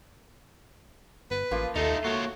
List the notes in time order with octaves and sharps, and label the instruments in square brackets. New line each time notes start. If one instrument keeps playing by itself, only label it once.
[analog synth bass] G1 [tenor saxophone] B4
[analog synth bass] A1 [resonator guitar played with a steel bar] F3 A#3 F4
[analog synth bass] D#2 [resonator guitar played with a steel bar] A3 [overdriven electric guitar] D#4 F4 [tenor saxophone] A4
[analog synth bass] A#3 [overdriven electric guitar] F4 C#5 [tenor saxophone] F#4